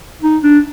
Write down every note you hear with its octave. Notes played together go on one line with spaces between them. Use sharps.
D#4
D4